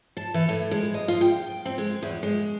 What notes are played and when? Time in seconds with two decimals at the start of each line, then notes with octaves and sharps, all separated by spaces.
0.17 A5
0.34 E3
0.49 A2
0.71 G#3
0.94 D#5
1.08 F4
1.21 G5
1.65 C4
1.78 G#3
2.02 E2
2.23 G#3